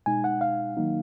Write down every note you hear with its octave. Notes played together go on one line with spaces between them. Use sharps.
B2 G#3 D#4 G#5
F#5
F5
D#3 F#3 A#3 D#4